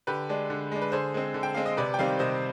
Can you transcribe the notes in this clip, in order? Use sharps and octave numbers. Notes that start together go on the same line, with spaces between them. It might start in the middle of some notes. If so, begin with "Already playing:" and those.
D3 G4 B4
G#3 D4
D3
G#3 D4
B4
D3 G#4 C5
G#3 C4
D3
G5
G#3 C4 F5
D#5
C3 B4 D5
G5
D#3 G3 C4 D5 F5
C3 C5 D#5